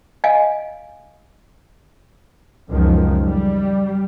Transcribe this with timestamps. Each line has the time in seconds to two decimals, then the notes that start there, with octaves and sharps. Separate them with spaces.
0.24 D#5 F5 G#5
2.70 C#2 F#2 D#3 F3
3.25 G3